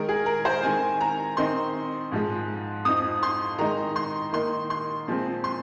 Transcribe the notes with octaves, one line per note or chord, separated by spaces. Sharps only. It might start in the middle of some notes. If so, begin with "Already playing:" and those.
Already playing: D#3 G#3 D#4 A#4
G#4
A#4
C5
D#3 G#3 C4 G#5
A#5
D#3 C4 D#4 C6
G#2 F3 G#3
F2 F3 C4 D#4 D#6
C6
D#3 G#3 D#4 A#5
C6
D#3 A#3 D#4 C6
C6
A#2 F3 G#3 C4
C6